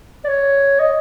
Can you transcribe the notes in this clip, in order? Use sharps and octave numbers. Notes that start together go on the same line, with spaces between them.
D5
C#5
D#5